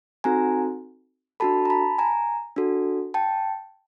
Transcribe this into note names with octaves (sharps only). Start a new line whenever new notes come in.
C4 D#4 F#4 A4 G#5 A#5
D4 F#4 A4 A5 B5
A#5
A5 B5
G#5 A#5
D4 F#4 A4
G5 A5